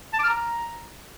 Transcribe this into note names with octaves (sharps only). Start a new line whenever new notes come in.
A5
D6
F6
A#5